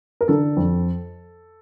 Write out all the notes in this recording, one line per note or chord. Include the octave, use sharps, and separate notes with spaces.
A#4
D3 A4
F2